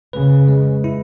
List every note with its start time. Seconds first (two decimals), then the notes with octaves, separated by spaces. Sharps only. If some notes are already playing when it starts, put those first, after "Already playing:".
0.13 C#3 B4
0.48 G#3
0.84 E4